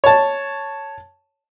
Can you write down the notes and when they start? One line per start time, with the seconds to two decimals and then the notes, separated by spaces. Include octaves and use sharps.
0.04 C#5 A5